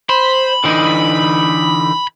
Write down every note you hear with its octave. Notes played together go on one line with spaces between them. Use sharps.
C5 B5
D3 E3 D#4